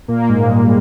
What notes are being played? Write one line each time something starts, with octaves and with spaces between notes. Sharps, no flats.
A#2 A#3
G#2 G#3
G3